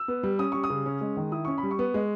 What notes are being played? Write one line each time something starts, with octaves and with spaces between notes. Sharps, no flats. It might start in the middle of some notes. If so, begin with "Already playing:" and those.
Already playing: E6
B3
G3
C#4 D#6
G3 C#6
D#6
C#3
C#4
G#3
D#3
E4 D#6
C#4 C#6
B5
G3
C#6
B3
G#3